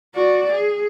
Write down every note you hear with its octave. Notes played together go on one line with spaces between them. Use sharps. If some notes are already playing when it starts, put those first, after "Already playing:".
F#4 D5
G#4